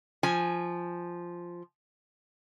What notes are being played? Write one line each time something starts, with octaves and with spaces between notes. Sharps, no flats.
F3 G#5